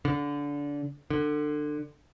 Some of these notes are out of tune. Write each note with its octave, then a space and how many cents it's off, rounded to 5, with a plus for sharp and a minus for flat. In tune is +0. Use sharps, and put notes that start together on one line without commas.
D3 -25
D3 +25